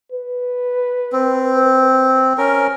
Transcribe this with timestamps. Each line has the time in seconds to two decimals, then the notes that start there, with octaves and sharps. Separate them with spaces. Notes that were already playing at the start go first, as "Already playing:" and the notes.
0.12 B4
1.13 C4
2.38 C#4 A#4